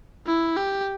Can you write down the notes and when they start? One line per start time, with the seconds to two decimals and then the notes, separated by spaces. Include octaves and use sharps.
0.26 E4
0.57 G4